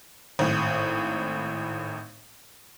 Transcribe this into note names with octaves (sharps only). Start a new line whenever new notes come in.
G#1 A2